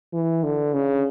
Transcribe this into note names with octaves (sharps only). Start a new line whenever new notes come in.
E3
D3
C#3